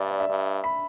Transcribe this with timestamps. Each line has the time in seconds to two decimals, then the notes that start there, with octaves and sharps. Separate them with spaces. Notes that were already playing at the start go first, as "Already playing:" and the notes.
Already playing: G2 D5 E5
0.11 D5
0.20 E5
0.29 G2
0.64 B5